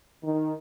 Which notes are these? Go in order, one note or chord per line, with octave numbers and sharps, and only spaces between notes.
D#3